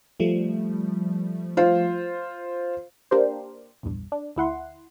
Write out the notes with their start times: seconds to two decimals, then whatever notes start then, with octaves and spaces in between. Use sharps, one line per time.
0.20 F3 G3 A3
1.57 F4 C5
3.11 A#3 D4 G4 A#4 C5
3.83 A#1 E2 G2
4.12 D4
4.36 D2 E4 F#5 C6